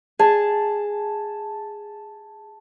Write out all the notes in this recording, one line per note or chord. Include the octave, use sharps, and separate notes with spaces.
G#4 A5